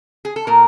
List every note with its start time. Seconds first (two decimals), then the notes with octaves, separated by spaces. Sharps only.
0.25 G#4
0.36 A4
0.47 A#2 A#4